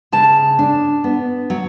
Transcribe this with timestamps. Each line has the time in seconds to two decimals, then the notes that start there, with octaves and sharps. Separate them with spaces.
0.12 C#3 A5
0.59 D4
1.04 B3
1.50 F#3